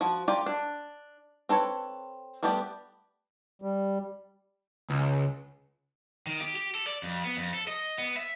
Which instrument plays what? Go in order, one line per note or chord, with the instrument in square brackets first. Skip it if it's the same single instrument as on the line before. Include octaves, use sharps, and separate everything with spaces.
[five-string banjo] F3 F#4
F4 G4 A#4 D5
D4
C4 A4 B4 C#5
G3 A3 B3 G4 D5
[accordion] G3
[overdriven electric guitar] C#2
D#3
G4
G4
A4
D5
F2
B3
F2
A4
D#5
B3
E5